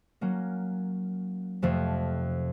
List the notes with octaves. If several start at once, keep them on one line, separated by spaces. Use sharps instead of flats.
F#3 A#3 C#4
F2 C3 F3 A3